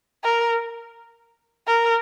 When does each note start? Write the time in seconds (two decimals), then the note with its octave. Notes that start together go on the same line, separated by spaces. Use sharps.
0.24 A#4
1.67 A#4